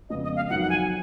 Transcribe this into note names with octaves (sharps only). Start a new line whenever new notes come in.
F2 C#3 G#3 B3 F4 D#5
D#5
F5
F2 D#3 F#3 F#5
F#5
G#5